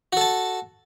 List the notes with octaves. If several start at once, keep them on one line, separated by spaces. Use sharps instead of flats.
F#4 A4 A5